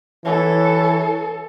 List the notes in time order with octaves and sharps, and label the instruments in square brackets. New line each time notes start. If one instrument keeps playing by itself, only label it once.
[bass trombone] E3 [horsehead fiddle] A4 [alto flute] C#5